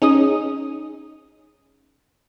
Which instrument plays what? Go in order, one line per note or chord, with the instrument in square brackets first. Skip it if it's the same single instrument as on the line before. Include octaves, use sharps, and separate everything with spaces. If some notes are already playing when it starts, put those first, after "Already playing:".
[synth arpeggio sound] C#4 D#4 G#4 D#6